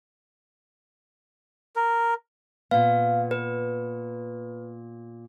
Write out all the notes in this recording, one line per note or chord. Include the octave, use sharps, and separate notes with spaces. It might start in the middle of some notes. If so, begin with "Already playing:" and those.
A#4
A#2 B3 F5
B4